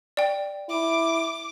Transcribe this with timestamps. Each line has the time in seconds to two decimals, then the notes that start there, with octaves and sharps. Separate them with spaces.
0.17 D5 G5
0.70 E4 D6